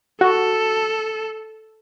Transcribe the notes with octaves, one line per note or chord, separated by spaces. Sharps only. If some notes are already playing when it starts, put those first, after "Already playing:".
F#4 A4